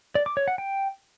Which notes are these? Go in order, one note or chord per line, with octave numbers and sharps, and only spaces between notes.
D5
D6
C#5
F#5
G5